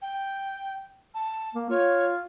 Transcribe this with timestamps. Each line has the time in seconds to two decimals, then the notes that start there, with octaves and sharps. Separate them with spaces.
0.02 G5
1.14 A5
1.55 A#3
1.70 F4 C#5